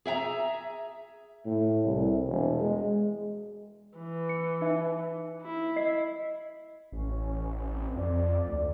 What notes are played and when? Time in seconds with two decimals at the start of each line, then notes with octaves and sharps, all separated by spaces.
0.06 G#4 E5 G5 A#5
1.46 A2
1.85 C2
2.28 E1
2.61 G#3
3.98 E3
4.29 C#7
4.61 D#4 E5
5.41 E4
5.76 D#5 C7
6.92 A1 C#4
7.74 C4
7.96 F2 D5
8.48 D2